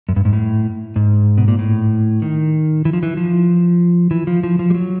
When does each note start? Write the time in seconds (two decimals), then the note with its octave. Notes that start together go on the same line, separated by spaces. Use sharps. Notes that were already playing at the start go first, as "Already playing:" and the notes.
0.09 F#2
0.16 G2
0.25 G#2
0.33 A2
0.96 G#2
1.38 B2
1.48 A#2
1.59 A2
2.22 D#3
2.85 E3
2.93 F3
3.03 E3
3.17 F3
4.11 E3
4.27 F3
4.43 F3
4.59 F3
4.70 G3
4.75 F#3